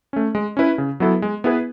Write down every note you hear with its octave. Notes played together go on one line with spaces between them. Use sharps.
A3 C#4
G#3
C#4 E4 B4
C#3
F#3 B3 E4 A4
G#3
B3 E4 G#4 B4